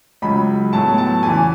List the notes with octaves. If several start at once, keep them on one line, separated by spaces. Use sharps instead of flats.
C#2 C#3 F#3 B5
A2 F#3 B3 A5
A5
E2 C#3 E3 G#5